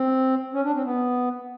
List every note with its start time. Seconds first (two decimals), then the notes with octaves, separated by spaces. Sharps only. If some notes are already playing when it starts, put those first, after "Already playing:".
Already playing: C4
0.54 C#4
0.64 D4
0.75 C4
0.85 B3